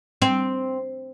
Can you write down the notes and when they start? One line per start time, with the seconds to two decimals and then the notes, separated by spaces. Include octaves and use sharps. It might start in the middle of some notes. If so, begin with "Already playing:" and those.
0.22 C4